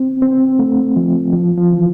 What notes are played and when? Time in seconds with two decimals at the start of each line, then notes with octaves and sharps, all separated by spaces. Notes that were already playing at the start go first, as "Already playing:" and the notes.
Already playing: C4
0.22 C4
0.59 A3
0.96 F3
1.33 F3
1.57 F3
1.72 E3